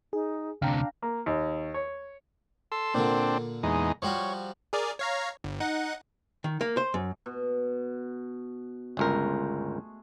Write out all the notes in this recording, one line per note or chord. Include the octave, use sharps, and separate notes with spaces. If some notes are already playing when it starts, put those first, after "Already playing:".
D#4 G#4
D2 C3 D4 F5 G5 A#5
A#3
D#2
C#5
A4 C6 E6
A#2 D3 C4 D4
E2 G#3 D#4
F3 G3 F#4 C#5
G#4 A#4 D5
C#5 F5 A#5
G1
D#4 F#5
D#3
A#3
C5
F#2
B2
G1 C#2 G#3 A3 A#4